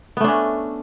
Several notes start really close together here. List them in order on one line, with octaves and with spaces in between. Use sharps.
B3 A3 D4 C#4